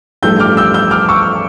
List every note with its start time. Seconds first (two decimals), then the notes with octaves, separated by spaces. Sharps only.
0.22 A1 G2 F3 A3 E6 G6
0.40 D6 F6
0.57 E6 G6
0.74 E6 G6
0.91 D6 F6
1.09 C#6 E6